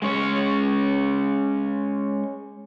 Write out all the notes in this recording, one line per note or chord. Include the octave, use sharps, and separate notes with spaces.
G#3 C#4 C#5